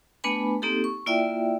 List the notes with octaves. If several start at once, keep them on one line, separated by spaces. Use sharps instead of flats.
A3 B3 D4 B4 G#5 B5
A#3 C4 D#4 G4 A4
C#6
A#3 E4 F4 D5 E5 G5